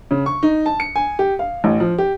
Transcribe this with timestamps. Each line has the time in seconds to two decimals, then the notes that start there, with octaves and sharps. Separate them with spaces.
0.11 C#3
0.26 C#6
0.43 D#4
0.66 A5
0.80 C#7
0.96 G#5
1.19 G4
1.39 F5
1.64 A1
1.80 F3
1.98 G4